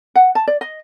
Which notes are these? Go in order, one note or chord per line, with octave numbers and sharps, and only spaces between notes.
F#5
A5
D5
D#5